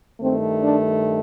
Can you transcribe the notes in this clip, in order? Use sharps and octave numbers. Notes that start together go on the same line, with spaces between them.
G2 D#3 A3 C4
D4